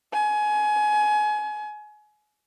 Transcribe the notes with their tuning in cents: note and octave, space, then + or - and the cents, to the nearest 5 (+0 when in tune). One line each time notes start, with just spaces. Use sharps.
G#5 +25